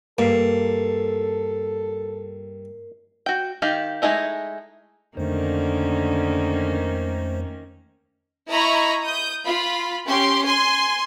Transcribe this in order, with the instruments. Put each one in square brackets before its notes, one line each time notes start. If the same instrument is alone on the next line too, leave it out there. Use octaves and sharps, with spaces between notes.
[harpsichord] G2 [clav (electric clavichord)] A#3 [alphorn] A4 [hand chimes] A#4 C7
[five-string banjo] F#4 G5
D#3 G4 F5
G#3 A3 D#4 E4
[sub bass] F2 [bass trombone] D3 [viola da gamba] D#3 A#3 C#4 [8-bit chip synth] A3 C5
[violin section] E4 D#5 A#5 B5 C#6
D#6 G6
F4 B5
C#4 G4 C6
G#5 C6